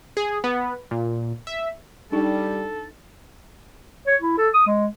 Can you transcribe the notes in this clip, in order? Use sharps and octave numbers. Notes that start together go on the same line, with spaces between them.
G#4
B3
A#2
E5
G3 D4 D#4 A4
C#5
E4
A4
D#6
G#3